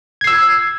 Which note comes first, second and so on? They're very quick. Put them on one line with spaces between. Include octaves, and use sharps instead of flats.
G#6 C7 E6